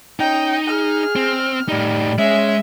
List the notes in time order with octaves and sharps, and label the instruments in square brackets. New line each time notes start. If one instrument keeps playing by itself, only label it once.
[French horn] C#4 [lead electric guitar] D#4 [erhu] G5
[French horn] G#4 [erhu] F6
[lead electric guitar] C4
[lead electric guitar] A2 D#4 [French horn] G3
[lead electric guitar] G#3 [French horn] C#4 [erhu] E5